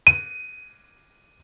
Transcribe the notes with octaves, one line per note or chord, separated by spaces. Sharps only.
D#7